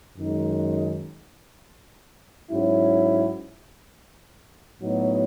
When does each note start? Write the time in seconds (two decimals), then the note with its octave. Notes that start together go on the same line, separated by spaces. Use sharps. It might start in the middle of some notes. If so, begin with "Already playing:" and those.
0.18 F#2 D#3 G#3 D#4
2.51 G#2 F#3 C#4 E4
4.82 A2 F#3 B3 D#4